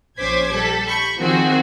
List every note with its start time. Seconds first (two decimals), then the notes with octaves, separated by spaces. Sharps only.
0.19 A#1 C#4 C5 D6 G#6 B6
0.53 G3 A4 B6
0.87 B5 C#6 G6
1.17 D#3 F3 C4 F#4 G#4